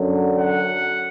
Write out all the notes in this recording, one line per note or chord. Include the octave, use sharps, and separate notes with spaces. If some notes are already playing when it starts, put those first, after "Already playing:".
Already playing: F#2 D3 F#3
F#5